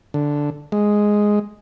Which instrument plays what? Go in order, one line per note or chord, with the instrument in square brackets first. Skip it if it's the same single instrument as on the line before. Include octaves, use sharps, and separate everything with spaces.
[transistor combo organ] D3
G#3